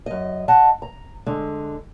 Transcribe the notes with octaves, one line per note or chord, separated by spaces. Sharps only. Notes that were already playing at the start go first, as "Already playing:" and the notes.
F#2 D#5
D#5 F#5 A5
A#5
D3 G#3